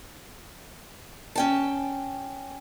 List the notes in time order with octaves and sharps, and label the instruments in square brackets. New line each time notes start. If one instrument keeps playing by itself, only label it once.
[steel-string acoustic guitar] C#4 G5 A5